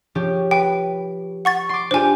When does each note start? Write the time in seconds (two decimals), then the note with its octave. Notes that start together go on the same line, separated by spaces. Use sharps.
0.15 F3 C#4 G4
0.51 B4 G5
1.45 F#5 C#6 A6
1.69 C6 D6
1.91 D4 F4 G4 C5 G#5